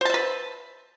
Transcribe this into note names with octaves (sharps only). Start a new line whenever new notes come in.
B4 C5 E5 A5